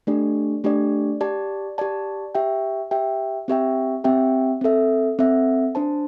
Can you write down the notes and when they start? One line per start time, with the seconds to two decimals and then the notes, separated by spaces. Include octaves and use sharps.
0.07 A3 D4 G4 D5
0.64 A3 D4 G4 D5
1.21 G4 D5 A5
1.78 G4 D5 A5
2.35 G4 E5 G5
2.91 G4 E5 G5
3.48 C4 G4 E5 G5
4.04 C4 G4 E5 G5
4.61 C4 A4 E5
5.19 C4 A4 E5
5.75 D4 C5 A5